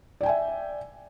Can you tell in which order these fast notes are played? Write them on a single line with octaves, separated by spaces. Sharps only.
D5 G5 G#5 E5